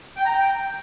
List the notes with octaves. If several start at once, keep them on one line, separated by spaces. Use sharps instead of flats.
G5
A#5
G5